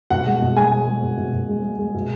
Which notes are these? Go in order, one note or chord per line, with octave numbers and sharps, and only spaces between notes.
B2 F#5
G#3
B2
G#3 G#5
G#3
G#3
B2
B2
B2
G#3
G#3
G#3
B2